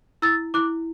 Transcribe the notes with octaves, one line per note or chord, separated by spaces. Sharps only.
E4 E6 A6
E4 D6 F#6